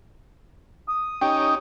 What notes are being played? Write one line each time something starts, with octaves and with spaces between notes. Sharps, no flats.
D#6
C#4 D#4 G4 G5